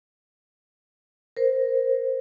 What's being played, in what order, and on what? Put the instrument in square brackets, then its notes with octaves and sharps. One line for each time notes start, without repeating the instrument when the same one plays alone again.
[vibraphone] A#4 C5